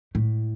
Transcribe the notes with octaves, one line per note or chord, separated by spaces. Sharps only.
A2